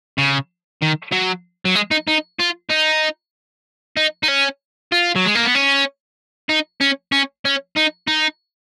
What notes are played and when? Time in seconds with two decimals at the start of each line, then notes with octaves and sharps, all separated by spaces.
0.18 C#3
0.82 D#3
1.12 F#3
1.65 F#3
1.75 G#3
1.91 D#4
2.08 D#4
2.40 F4
2.70 D#4
3.97 D#4
4.23 D#4
4.28 C#4
4.92 F4
5.16 F#3
5.25 G#3
5.35 A#3
5.45 B3
5.55 C#4
6.49 D#4
6.81 C#4
7.12 C#4
7.45 C#4
7.76 D#4
8.07 D#4